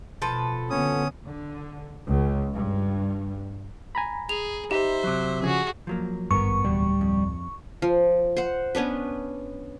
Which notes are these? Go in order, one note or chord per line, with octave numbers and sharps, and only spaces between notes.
B2 F3 A4 B4
D3 B3 C#4 D#6
D3
C#2
G2
G#5 A#5 B5
G#4 F7
D#4 G4 C5 E5
C3 F#3
C#3 F3 F#4 G#4 G#5
F3 F#3 A#3
G#1 G2 B3 A4 A#4 C#6
D1 E2 B2 G3
F2
F3
C5 F#5
B3 C#4 D4 B4